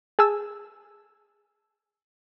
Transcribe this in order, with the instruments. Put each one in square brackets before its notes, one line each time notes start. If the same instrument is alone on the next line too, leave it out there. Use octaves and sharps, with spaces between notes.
[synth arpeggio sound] G#4 G#5 A5 E6